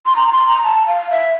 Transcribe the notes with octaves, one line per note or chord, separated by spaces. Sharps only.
C6
A#5
A#5
C6
A#5
A5
F5
E5